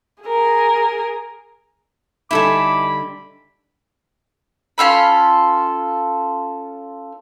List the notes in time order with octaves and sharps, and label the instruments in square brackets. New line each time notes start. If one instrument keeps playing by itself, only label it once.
[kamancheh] G#4 A#4
[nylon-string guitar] D3 G3 D#4 [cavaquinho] E4 A4 G#5 [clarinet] B5 [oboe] D6
[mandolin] C#4 F4 A4 B5